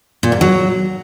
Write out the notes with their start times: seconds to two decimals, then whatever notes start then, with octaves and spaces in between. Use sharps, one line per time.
0.23 A#2
0.32 G#2
0.41 F#3